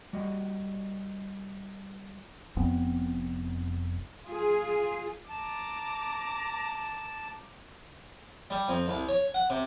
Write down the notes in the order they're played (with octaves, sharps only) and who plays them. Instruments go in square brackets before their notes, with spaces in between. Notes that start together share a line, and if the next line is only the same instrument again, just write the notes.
[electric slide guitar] G3 F#4 D#5
[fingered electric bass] F1 F2 B3 C4
[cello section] F4 G#4
[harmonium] A5 [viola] A#5 D6
[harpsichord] G3
F2
C2
C#5
F#5
C3